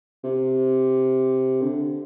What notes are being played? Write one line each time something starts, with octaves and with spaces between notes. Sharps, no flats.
C3
D3